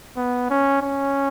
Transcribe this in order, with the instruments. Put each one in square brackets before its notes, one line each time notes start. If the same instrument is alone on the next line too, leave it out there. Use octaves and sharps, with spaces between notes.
[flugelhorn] B3
C#4
C#4